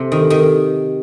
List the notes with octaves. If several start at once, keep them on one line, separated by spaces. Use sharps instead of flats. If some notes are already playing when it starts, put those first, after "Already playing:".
Already playing: C3
D#3
D#3